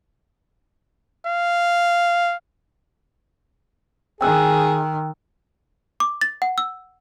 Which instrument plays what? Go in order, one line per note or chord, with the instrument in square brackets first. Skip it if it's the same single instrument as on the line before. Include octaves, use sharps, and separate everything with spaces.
[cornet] F5
[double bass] D#3 [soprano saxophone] G#4 [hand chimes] G5 E6 F#6
[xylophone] D6
A6
F#5
E6